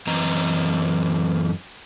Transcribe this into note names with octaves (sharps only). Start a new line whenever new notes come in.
F#2 E3 C4 D#5 A#5